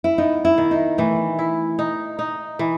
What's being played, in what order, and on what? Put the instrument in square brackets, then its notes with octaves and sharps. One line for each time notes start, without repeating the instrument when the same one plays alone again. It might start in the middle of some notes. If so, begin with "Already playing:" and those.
[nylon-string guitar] E4
[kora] B3 [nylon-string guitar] D#4
[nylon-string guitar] E4
[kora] D#3
[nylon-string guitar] D#4
[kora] E3 [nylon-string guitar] A3
[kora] E4
D#4
D#4
E3